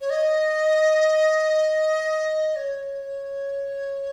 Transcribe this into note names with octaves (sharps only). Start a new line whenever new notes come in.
C#5
D#5
C#5